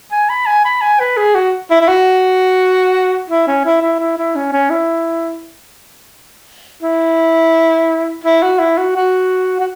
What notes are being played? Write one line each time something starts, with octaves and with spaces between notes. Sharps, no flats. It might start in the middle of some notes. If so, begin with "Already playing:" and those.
G#5
B5
G#5
B5
G#5
B4
G#4
F#4
E4
E4
F#4
E4
C#4
E4
E4
E4
E4
C#4
C#4
E4
E4
E4
F#4
E4
F#4
F#4
F#4